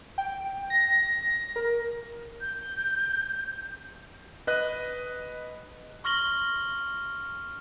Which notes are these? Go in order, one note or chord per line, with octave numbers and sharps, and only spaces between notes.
G5
A#6
A#4
G6
B4 D#5 F#6
C6 C#6 F6 A#6 F#7 G7